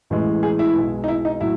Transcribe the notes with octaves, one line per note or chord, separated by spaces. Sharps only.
A1 A2 E3 G#3
G#4
E4
B1 B2 G#3
D#4
E4
D#4
A2 F#3 E4